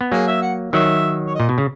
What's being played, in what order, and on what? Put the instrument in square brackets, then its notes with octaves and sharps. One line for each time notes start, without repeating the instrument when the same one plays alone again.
[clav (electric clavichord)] B3
[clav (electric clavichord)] F#3 A#3 [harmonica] G#4
[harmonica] E5
F#5
[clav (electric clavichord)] D#3 F#3 [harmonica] E5
[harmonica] C#5
[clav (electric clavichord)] A#2 [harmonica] D#5
[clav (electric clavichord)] B2
C#3